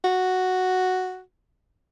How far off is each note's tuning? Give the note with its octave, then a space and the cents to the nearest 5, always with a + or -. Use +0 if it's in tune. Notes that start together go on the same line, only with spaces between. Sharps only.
F#4 +0